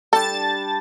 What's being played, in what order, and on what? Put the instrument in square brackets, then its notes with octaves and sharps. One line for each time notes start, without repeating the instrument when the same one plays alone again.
[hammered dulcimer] G3 D4 G4 [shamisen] A4 [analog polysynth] A5 A6